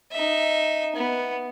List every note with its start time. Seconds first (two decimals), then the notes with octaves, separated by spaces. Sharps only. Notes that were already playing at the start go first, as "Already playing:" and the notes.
0.12 D#4 E5
0.95 B3